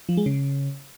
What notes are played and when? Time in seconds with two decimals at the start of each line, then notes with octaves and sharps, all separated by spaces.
0.09 F3
0.17 G#3
0.26 C#3